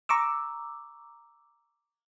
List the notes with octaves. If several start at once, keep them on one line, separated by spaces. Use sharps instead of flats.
A#5 C#6 D6 E6